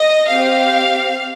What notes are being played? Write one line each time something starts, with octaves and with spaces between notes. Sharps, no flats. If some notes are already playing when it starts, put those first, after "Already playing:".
Already playing: D#5
C4 G4 F5